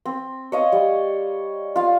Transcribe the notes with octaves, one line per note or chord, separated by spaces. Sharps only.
C4
C#5 D#5 F5
G3
F4 F5